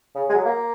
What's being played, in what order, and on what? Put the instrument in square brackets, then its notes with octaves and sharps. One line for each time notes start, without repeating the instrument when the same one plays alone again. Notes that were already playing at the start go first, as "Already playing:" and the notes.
[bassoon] C#3
G#3
F#3
A#3